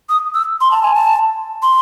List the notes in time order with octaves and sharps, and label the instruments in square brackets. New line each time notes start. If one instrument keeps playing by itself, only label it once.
[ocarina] D#6
E6
C6
A5
G#5
A5
C6